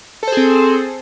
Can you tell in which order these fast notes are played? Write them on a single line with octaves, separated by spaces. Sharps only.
A4 C5 G#4 C4